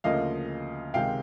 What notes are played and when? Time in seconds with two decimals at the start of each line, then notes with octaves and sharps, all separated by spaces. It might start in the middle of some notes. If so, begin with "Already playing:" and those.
0.04 D2 C#3 F3 A#3 D#5 F5
0.94 C#2 C3 D#3 G#3 F5 G5